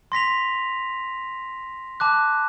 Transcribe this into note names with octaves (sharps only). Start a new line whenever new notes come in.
C6 A#6 B6 F7
A5 D6 F#6